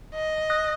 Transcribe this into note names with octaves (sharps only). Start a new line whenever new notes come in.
D#5
D#6 F#6 A#6